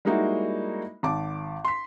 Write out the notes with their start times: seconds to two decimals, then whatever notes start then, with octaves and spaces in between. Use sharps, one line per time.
0.05 G3 G#3 A#3 D#4 E4 F#4
1.03 G#1 A5 D6
1.65 C6 B6